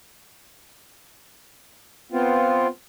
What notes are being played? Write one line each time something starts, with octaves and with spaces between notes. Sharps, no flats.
B3 C4 F4